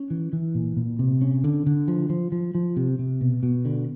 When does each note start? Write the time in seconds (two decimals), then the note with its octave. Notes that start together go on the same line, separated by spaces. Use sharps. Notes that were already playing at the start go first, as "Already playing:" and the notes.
Already playing: C#4
0.10 E3
0.33 E3
0.55 A#2
0.77 A#2
0.99 C3
1.21 C#4
1.44 D3
1.66 D3
1.88 F3
2.10 F3
2.32 F3
2.55 F3
2.77 C3
2.99 C3
3.21 B2
3.43 B2
3.65 D3